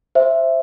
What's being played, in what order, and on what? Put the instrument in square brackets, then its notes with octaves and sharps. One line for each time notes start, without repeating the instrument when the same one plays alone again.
[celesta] C5 E5